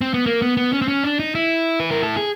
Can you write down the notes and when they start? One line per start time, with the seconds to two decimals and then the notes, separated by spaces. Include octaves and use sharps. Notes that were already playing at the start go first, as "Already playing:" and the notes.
0.01 C4
0.14 B3
0.26 A#3
0.42 B3
0.57 B3
0.73 C#4
0.82 C4
0.88 C#4
1.04 D4
1.19 D#4
1.35 E4
1.80 B4
1.91 A#4
2.03 A4
2.17 G#4